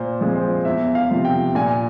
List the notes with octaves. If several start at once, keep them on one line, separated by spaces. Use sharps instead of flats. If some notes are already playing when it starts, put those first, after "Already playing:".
Already playing: A#2 C5
F3 G#3 C4
C5
E2 E5
F5
C3 F3
G5
A#2 G#5